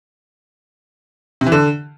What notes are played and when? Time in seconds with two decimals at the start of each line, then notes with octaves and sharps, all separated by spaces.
1.41 C3
1.46 E3
1.52 D3